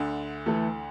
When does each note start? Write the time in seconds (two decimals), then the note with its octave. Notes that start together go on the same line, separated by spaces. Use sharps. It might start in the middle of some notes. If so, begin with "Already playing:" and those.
Already playing: D2 D3
0.46 E3 A3 E4 A4